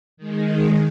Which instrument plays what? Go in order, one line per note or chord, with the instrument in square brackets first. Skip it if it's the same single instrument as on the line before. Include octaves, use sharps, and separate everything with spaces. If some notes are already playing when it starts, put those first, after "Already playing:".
[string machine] D#3 G#3